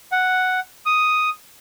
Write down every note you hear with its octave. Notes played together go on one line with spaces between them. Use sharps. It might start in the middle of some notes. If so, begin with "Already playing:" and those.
F#5
D#6